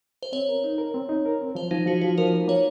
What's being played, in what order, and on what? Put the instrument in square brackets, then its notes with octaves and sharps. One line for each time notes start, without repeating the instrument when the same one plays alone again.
[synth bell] C5
[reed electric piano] C4 [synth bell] C#5
[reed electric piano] A#4
D#4
A#4
C4
D#4
A#4
C4
[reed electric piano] F3 [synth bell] C5
[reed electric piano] F3 [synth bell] D#4
[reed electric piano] F3 [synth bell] F#4
[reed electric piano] F3 [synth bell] F#4
[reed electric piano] F3 [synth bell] A#4
[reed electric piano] A#3
[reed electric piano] A#3 [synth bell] C#5